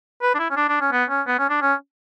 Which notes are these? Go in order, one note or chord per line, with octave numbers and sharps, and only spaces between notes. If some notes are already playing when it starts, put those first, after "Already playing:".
B4
D4
E4
C#4
D4
D4
C#4
B3
C#4
B3
C#4
D4
C#4